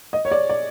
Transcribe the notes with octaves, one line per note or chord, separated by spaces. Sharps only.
D#5
C#5
D5
D5